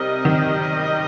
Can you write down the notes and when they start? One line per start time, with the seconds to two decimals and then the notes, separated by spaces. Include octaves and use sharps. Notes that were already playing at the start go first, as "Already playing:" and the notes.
Already playing: C3 G3 D#4 A#4 D#5
0.25 D#3